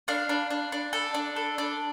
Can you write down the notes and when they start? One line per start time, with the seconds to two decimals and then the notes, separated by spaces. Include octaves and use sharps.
0.08 D4 F5
0.29 D4
0.50 D4
0.72 D4
0.93 A4
1.14 D4
1.36 A4
1.58 D4